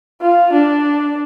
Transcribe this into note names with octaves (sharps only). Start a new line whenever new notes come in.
F4
D4